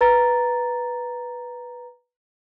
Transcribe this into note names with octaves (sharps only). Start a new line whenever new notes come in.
B4 A#5 A6